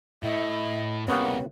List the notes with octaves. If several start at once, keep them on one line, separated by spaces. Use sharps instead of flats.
A2 E4 D#5
C2 C#3 A#3 B3 C#4 G4 F#5